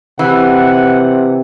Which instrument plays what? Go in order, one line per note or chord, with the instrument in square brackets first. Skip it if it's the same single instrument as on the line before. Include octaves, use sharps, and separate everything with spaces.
[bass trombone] C3 [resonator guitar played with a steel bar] E3 [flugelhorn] F#5